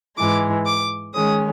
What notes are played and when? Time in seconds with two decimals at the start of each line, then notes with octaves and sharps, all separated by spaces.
0.17 G#2 E3 G#3 D6
0.66 D6
1.14 D#3 G#3 C#4 D#6